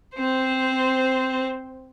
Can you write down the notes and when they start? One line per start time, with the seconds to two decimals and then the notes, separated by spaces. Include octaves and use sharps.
0.15 C4 C5